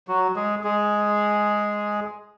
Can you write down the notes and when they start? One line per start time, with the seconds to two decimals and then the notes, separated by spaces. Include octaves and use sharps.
0.08 F#3 F#4
0.36 G#3 G#4
0.64 G#3 G#4